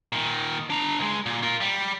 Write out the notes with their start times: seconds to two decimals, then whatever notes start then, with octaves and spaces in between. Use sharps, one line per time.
0.13 A#2 D#3
0.70 D4 A#5
0.99 C#2 G#3
1.26 A#2
1.43 F4 A#4
1.61 G3